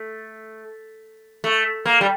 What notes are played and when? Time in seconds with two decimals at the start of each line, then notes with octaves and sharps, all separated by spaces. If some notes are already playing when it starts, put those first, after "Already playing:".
Already playing: A3
1.44 A3
1.86 A#3
2.01 G3